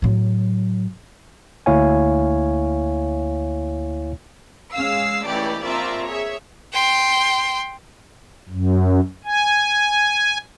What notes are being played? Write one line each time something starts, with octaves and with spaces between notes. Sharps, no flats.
A2 F#3
D2 A#3 E4 C#5 F5 G#5
G#3 C#4 F5 E6 C7
C#2 E3 A3 G4 D5
A#1 C4 F4 D5 E5 A#5
G#4 C#5 E5
G5 C6
F#2
G#5